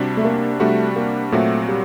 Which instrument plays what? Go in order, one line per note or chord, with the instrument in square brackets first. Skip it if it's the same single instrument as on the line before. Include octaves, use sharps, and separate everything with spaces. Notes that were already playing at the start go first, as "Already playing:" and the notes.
Already playing: [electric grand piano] C3 G3 D4 F#4
[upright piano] A3
A#3
[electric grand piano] C3 G3 D4 F#4 [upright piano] A3
[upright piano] A#3
[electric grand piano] A#2 F#3 C4 F#4 [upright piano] A3
[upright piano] G3